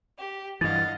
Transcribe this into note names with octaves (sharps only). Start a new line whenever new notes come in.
G4
G2 E3 D#5 F5 F#5 A6